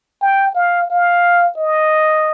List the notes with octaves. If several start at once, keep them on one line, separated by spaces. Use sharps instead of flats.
G5
F5
F5
D#5